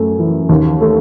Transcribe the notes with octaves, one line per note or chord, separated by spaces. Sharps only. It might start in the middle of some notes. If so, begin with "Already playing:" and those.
Already playing: F#2 A3
E3
D#2
A3